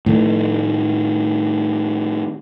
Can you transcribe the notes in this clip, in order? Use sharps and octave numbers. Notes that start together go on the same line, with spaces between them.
A2 D#3 A3